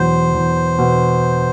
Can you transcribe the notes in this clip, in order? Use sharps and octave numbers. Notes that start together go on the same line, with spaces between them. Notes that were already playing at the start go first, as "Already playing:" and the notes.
Already playing: E2 B2 F#3 C5
E2
B2